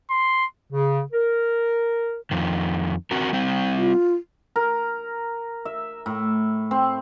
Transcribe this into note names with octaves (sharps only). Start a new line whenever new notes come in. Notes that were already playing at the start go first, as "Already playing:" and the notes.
C6
C#3
A#4
F2 D#3
C4 F#4 A#4
G3 C4
F4
A#4
E5
A2
C4